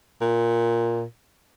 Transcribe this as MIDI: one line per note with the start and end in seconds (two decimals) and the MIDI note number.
0.21 1.03 46